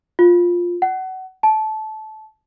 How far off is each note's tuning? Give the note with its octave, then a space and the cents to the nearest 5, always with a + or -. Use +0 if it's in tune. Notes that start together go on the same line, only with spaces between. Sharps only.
F4 +5
F#5 +25
A5 -20